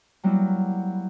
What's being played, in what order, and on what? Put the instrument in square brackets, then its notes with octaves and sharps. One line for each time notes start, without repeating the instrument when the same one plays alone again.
[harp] F#3 G3 A#3 B3 E4